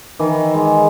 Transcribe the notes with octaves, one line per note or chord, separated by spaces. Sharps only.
D#3 E3
G#3